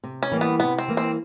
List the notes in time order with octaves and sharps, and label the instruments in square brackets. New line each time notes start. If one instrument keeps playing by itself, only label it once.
[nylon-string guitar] C3
[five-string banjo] C#4
[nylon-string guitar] E3 G3 A#3
[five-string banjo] B3
[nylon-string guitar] C3 [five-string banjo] B3
[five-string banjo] C4
[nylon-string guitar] E3 G3 A#3
[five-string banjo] C4